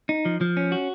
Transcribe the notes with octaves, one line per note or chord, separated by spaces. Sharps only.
D#4
F3
F3
C#4
F#4